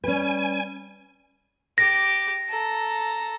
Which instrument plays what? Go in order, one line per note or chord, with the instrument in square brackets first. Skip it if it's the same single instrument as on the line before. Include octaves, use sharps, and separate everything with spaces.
[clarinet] G3 [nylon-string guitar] C#4 B4 [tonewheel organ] G#5
[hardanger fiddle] G4 D6 [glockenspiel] A#6
[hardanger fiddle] A4 A#5